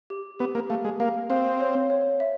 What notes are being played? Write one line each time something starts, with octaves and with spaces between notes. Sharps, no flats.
G4
B3 G4
A#3
A3 F5
G#3
A#3 F5
C4 F5
C#5
C#5
E5